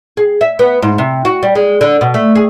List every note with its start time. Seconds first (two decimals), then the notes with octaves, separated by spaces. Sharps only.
0.17 G#4
0.41 E5
0.59 B3
0.82 G#2
0.98 C3
1.25 F#4
1.43 G3
1.55 G#3
1.81 D3
2.01 B2
2.14 A3
2.35 G#4